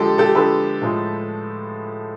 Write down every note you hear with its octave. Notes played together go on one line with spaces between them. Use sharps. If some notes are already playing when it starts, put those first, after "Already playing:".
Already playing: D3 F3 G#3 G4 A4
G4 A4
D3 F3 G#3 A4 B4
A2 F3 G#3